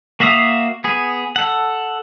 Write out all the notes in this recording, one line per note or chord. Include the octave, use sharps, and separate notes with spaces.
A#3 F#4 E5 F5 D#6
B3 G#4
A4 F#5